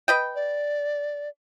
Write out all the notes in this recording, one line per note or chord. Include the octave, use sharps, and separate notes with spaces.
B4 D#5 G5
D5